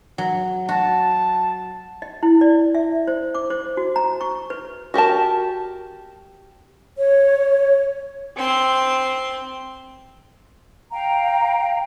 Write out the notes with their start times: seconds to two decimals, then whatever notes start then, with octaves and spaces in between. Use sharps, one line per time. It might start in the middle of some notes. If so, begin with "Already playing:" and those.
0.18 F#3
0.69 F#4 A5
2.02 D#5
2.23 E4
2.41 D5
2.75 E5
3.07 C5
3.35 D6
3.50 C5
3.77 F#4
3.96 A#5
4.21 C#6
4.50 B4
4.94 F#4 G4 A#4 A5
6.97 C#5
8.36 C4 C6
10.91 F5 G5 A#5